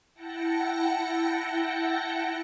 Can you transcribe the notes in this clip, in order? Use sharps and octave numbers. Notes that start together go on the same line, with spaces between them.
E4 F#5 G5 A5 A#6 C#7